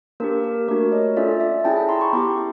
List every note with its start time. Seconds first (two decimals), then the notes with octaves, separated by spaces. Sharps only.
0.20 A#3 D4 G4 A#4
0.44 A#4
0.68 A3 D4 F#4 A#4
0.92 C#5 D#5
1.17 C#4 F4 A4 D5 E5
1.40 D5 E5
1.64 C#4 E4 G#4 G5 A5
1.76 G5 A5
1.88 A#5 C6
2.01 B5 C#6
2.13 B3 E4 G4 C6 D6